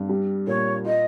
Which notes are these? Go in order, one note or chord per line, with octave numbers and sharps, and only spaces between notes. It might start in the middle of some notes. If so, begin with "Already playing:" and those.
Already playing: G2
G3
A#2 C#5
F4 D#5